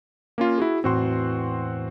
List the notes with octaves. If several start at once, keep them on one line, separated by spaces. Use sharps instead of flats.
A#3 C#4 F4
E4 F#4 G#4
E2 A2 C4 F#4 C6